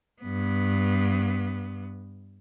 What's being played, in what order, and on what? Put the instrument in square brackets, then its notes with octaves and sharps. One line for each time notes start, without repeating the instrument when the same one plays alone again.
[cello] G2 B3